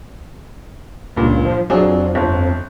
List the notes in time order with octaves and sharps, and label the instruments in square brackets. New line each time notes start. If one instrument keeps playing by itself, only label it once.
[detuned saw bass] C#2 [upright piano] G2 A#2
[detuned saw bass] F3
[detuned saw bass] F2 [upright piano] F#3 D4 G#4
[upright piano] G1